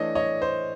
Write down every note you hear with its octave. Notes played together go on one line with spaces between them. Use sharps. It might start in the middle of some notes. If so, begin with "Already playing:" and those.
Already playing: E3 A3 D4 C#5 D#5
C#5 D#5
C5